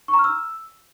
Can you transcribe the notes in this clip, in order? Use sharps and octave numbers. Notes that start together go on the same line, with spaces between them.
C#6
A#5
F6
E6